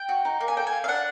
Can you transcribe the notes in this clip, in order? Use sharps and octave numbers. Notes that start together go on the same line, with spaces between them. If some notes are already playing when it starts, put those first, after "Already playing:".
Already playing: G5
F#4
D#4
A#3
G#5
A4 G5
G#5
F4
F5
D4 F#5